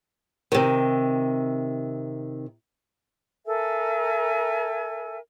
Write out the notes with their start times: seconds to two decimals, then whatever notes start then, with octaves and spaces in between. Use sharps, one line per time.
0.52 C3 D#3
3.46 A4 A#4 E5 G#5